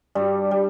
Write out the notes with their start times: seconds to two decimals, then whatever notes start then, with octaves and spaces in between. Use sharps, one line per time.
0.15 G2 G3
0.51 G3